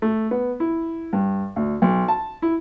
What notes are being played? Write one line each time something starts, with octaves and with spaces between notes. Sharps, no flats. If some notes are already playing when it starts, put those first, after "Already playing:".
A3
B3
E4
G2
D2
B1
A5
E4